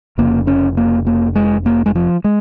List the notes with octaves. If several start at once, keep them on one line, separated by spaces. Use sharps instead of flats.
F1 F2 C#3 A#3
C#4
A#3
A#3
G#3
A#3
G#3
F3
G#3